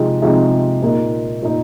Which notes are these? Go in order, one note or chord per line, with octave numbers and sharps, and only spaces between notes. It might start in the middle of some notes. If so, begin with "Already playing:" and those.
Already playing: C3 F3 G#3 D#4
C3 F3 G#3 D#4
A#2 A#3 D#4
A#2 A#3 D#4